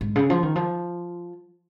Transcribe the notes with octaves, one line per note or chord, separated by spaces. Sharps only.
G#2
C#3
F3
D#3
F3